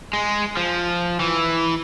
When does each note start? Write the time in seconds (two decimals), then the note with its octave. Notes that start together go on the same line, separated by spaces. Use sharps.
0.13 G#3
0.57 F3
1.20 E3